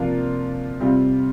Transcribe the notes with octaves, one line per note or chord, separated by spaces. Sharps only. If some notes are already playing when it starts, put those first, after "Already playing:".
Already playing: C3 F3 A#3 D4 F4
C3 G3 C4 F4